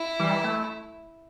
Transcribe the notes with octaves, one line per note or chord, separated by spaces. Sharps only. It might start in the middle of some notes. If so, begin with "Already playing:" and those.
Already playing: E4
E3 G3
A3